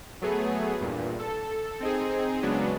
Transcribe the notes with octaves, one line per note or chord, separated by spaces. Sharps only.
F#3 A3 B3 G#4
E2 G2 A#2
A4
C4 D#4 G#4
C#3 F#3 G#3 B3 D4